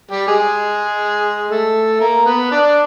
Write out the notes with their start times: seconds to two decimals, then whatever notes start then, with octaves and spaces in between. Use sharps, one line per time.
0.11 G3 G4
0.27 G#3 G#4
1.48 A3 A4
2.00 A#3 A#4
2.25 B3 B4
2.51 D4 D5